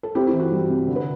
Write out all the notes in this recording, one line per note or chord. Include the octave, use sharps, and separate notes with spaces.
A4
C4 E4 G4
E4
E3
F#4
G3
C3
D3
B4